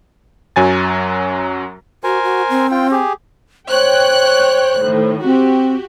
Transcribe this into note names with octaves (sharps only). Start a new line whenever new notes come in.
F#2 F#3 G#5 A6
F#4 A#4 C5 G#5
F#4
C4
F4 G5
G4 G#4
C5 C#5 G5 F#6
A2 D#3
C4 F#4 G4